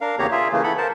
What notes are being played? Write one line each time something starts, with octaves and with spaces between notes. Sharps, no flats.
D4 A#4 F5
E2 C#3 A#3 G4 C#5 A#5
F4 G#4 E5
C#3 E3 A3 A#3
E3 A4 F#5 B5
A#4 C5 A5